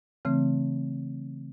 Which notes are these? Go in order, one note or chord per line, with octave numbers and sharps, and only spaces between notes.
C#3 E3 A3 C4